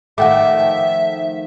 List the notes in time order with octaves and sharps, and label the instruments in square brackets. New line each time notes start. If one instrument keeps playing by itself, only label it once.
[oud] D#3 F3 A3 [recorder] E5 [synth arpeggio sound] F#5 G5 D6